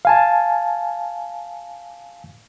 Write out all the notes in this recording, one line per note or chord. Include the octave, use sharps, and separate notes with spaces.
F5 G#5 A5